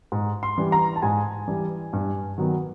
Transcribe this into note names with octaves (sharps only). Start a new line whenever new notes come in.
G#2
C6
E3 G3
A#5
A5
G#2 G#5
E3 G3
G2
D#3 F#3 B3